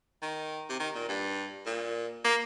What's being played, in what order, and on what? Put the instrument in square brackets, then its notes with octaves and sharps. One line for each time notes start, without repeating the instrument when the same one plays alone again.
[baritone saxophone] D#3
C3
D#3
A#2
G2
A#2
A#3